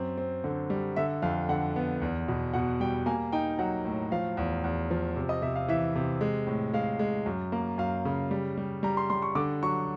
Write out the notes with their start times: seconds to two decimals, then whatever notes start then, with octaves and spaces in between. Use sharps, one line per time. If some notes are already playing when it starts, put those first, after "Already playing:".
Already playing: F#2 C4
0.18 C4
0.44 D3
0.70 G3
0.96 D3 E5
1.22 F2 F5
1.49 D3 F#5
1.76 B3
2.02 E2
2.28 B2
2.54 B2 F#5
2.80 G3 G5
3.06 A#3 G#5
3.32 D#4 G5
3.59 F#3 F#5
3.85 A2
4.12 F3 F5
4.37 E2
4.64 E2
4.91 F3
5.16 C3
5.29 D#5
5.42 C3 E5
5.56 F5
5.68 E3 E5
5.96 C3
6.21 G#3
6.47 A2
6.73 G#3 F5
6.99 G#3
7.26 F#2
7.52 A#3
7.78 F#2 F5
8.05 C#3
8.31 G3
8.58 G3
8.83 G3 A#5
8.97 C6
9.10 G3 C6
9.22 C#6
9.35 D3 D6
9.63 F#3 C#6